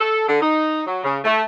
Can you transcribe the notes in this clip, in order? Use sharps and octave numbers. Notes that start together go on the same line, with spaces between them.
A4
D3
D#4
F#3
C#3
A3